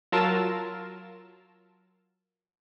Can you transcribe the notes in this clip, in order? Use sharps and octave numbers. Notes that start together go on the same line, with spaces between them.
F#3 F4 A#4 A5 E6 E7